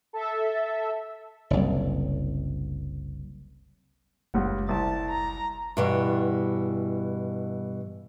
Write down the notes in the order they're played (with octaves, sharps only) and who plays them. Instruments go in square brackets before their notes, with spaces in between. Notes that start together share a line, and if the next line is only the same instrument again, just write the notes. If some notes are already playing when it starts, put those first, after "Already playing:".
[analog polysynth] A4 E5
[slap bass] F#1 C2
[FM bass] F#1 [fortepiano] C#2 G3 F#5
[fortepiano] C2 [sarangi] A5
[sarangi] A#5
[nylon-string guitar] G2 B2 E3